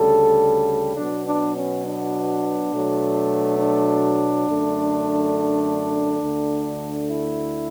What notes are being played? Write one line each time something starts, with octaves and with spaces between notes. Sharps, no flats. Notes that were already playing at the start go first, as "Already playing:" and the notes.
Already playing: D2 C#3 G3 A4
B2 F#3 B3 D4
D4
C#4
D4
B2 F#3 A3
D4
F#2 D3 A3
D2 D3 A3
E4